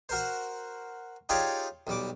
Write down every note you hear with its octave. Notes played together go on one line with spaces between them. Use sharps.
F#4 A#4 C5
D#4 F4 G4 G#4 C#5 D5
B1 G3 D6